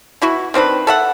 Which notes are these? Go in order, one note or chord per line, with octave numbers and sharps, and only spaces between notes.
B2 E4 F#4
D#3 C4 D4 B4
A4 E5 F#5